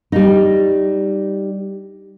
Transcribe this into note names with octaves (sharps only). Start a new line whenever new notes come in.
G3 D#4